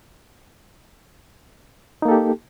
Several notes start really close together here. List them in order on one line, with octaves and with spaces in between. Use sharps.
D#4 A#3 A4 G4